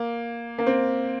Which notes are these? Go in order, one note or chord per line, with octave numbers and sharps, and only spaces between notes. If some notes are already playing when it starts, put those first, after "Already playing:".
Already playing: A#3
A#3
C4